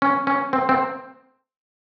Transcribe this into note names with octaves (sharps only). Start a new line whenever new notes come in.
C#4
C#4
C4
C4